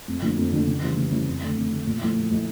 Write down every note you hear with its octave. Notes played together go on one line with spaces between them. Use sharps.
F2
D3 F3 A#3 D4
F2
D3 F3 A#3 D4
C#3
E3 G3 C#4 E4
C#3
E3 G3 C#4 E4
F2
D3 A3
F2
D3 A3
A#2
F3 A3 E4
A#2
F3 A3 E4